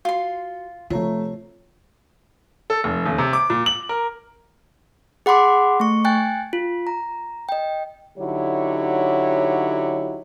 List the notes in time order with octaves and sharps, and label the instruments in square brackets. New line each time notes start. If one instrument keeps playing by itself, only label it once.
[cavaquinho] F4 C6 [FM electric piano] F#4
[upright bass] C3 [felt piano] F3 A3 [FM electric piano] F4 C#5 A#5
[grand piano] A4
F1
D#1
C3
D6
A#2
F#7
A#4
[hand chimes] G#4 F#5 B5 C6 D6
A3 C#6
G5 G#5 F#6 A6
F4
A#5
D#5 G5
[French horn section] D3 F#3 D#4 E4 G4 C#5